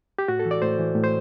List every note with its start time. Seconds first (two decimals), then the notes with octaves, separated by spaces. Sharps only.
0.19 G4
0.28 A2 F#4
0.39 A4
0.46 E3
0.51 D5
0.62 A2 C5
0.79 E3
0.95 A2
1.04 C5